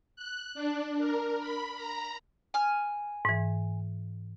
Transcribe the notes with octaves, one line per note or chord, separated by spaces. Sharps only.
F#6
D4
A#4
B5
A#5
G#5 F6
G#2 E3